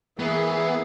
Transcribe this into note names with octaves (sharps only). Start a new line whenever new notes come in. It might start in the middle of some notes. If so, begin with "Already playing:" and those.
E3 A#3 B3 G#4